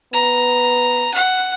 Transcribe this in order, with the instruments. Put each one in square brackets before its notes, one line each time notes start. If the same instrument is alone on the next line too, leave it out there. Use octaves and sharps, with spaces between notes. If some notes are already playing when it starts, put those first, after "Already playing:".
[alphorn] B3 [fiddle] A#5
[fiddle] F#5